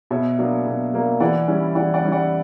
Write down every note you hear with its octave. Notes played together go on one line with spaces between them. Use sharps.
B2 C#5 E5
F#3 A#3 D4
B2
F#3 A#3 D4
E3 D5 F#5
G3 C#4 E4
E3 D5 F#5
D5 F#5
G3 C#4 E4
D5 F#5